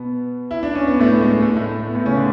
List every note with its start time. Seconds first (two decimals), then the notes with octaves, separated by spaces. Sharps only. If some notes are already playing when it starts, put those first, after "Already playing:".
Already playing: B2 B3
0.51 E4
0.63 D4
0.75 C#4
0.87 B3
1.00 A2 A3
1.21 G#3
1.42 A2 A3
1.56 A2 A3
1.86 B3
1.95 A2 A3
2.05 C#3 C#4
2.16 D3 D4